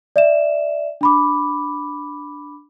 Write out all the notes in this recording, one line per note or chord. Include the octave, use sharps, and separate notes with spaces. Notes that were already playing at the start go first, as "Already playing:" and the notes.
D5 E5 E7
D4 B5 D6